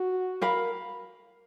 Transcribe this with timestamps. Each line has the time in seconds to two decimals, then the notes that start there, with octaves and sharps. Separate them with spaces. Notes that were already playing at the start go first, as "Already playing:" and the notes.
Already playing: F#4
0.42 A#4 F5 B5